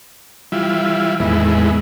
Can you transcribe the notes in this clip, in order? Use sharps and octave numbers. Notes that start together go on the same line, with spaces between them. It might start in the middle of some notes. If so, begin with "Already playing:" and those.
E3 G3 E4 F4
E2 A2 D#3 G#3 B3 E4